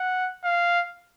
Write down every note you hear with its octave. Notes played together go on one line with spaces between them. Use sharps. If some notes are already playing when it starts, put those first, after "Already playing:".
Already playing: F#5
F5